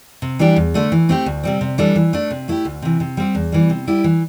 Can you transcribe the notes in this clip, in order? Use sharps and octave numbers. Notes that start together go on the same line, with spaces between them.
C3
E3 G3 D4 G4
E2
D3 A3 D4
E3
A3 C4 E4 G4
D2
C3 G3 C4
C3
E3 G3 D4 A4
E3
A3 D4
C3
A3 E4 G4
D2
C3 E3
C3
G3 C4 G4
E2
E3 G3
C3
G3 E4 G4
E3